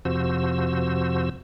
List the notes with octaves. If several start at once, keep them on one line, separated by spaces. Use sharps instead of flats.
F2 C3 F3 F#4 C5 E6